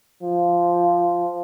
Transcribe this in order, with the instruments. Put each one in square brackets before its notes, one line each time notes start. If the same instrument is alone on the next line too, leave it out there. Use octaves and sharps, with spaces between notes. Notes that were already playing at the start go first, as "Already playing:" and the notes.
[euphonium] F3